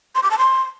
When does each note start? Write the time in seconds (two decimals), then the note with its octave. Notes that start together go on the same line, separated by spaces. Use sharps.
0.15 C6
0.23 D6
0.31 A5
0.38 C6